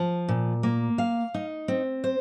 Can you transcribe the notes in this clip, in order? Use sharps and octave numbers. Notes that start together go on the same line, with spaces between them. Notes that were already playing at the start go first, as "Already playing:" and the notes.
Already playing: F3
A#2
A#3
F5
D#4
C4
C5